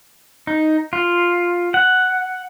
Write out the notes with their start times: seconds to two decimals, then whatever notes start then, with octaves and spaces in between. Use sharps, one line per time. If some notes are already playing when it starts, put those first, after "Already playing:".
0.47 D#4
0.93 F4
1.74 F#5